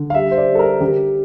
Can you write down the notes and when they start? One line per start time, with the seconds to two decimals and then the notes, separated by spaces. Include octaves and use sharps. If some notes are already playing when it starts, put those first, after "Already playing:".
Already playing: D3
0.10 F5
0.14 G3 E5
0.31 C5
0.38 D5
0.48 G3
0.55 A4
0.59 A#4
0.81 D3 G4